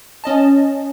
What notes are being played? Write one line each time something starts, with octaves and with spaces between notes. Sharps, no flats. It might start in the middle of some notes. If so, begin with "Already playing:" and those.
C#4 D#5 A5